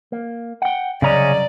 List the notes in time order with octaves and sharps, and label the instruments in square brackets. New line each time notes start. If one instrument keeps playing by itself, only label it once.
[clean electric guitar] A#3
F#5 G5
[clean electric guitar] C2 F#2 A#5 [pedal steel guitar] C#3 C#4 D#5 [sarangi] D5